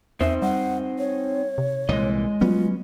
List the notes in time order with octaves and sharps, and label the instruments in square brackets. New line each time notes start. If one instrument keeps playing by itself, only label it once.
[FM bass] E2 [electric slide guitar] C4 D#4 C5 [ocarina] E5
[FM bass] G3 [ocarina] F#5
[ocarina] C#5
[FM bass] C3
[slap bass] C2 A#2 E3 [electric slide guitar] G#3 D#5
[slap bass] F#3 B3 C#4 [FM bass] G3 [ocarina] F4